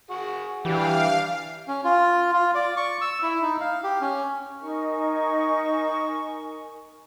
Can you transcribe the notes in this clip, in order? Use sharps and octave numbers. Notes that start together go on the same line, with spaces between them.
F#4 G#4
E3 G3 D4 G4 F5 G5
C#4
F4
F4
D5
C#6
E6
E4
D#4
F5
G4
C#4
D#4 A#4 G#5 C#6